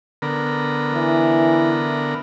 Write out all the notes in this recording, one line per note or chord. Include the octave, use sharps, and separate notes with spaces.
D3 B3 A#4
E3